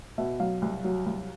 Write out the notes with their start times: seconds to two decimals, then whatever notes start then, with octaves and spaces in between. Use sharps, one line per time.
0.18 B2 E5
0.40 F#3 F5
0.62 C2
0.84 F#3
1.06 C2